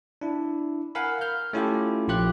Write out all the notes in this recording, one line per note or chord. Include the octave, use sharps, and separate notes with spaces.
D4 E4
A#4 F5 F#5 G#5 B5
F6 G6
A3 C#4 E4 F4 G4 A4
A#1 F4 G4 F#6